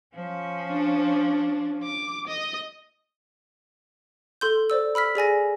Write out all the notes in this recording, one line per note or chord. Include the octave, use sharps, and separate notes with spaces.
F3 C#4
D4
D6
D#5
A4 C6 G6
C5 D5 E6
B5 E6 F6 B6
G#4 D5 G#5 A#6